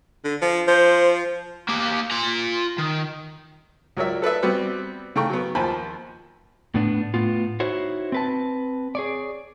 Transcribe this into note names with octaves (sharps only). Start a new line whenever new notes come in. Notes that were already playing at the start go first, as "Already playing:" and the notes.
D3
F3
F3 C5
A#3 G4
F4 A#5
D#3
C#2 F#3 A#4 C#5 D5 E5
A4 B4 D5 E5
G3 B3 C4 F#4 B4
C#3 E3 A3 G5 A#5 C#6
F#3 B3
D#2 F3 C5 G#5 A5 B5
A2 B3 D4
A2 B3 F4
D#4 E4 F#4 C5 C#5
C4 B4 A5
G#4 C#5 D5